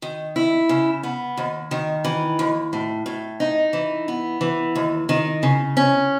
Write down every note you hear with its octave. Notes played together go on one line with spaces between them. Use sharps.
D#3
E4
C#3
B3
D#2
D#3
E3
D#2
A2
A2
D#4
E3
B3
E3
D#2
D#3
C#3
C#4